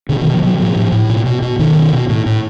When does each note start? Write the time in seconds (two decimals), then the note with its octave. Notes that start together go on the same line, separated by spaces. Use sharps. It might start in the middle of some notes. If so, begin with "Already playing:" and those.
0.09 B2 D3
0.21 D#3
0.26 B2
0.34 F3
0.42 B2 F#3
0.59 A2 F3
0.76 A2
0.92 A2
1.10 B2
1.25 B2
1.42 B2
1.59 B2 D#3
1.76 B2
1.93 B2
2.09 A2
2.26 A2